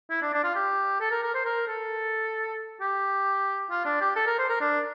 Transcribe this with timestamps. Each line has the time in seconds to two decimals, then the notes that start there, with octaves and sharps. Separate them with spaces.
0.10 E4
0.22 D4
0.33 D4
0.44 F4
0.55 G4
1.01 A4
1.11 A#4
1.23 A#4
1.35 C5
1.45 A#4
1.68 A4
2.81 G4
3.71 F4
3.85 D4
4.01 G4
4.16 A4
4.27 A#4
4.39 C5
4.49 A#4
4.61 D4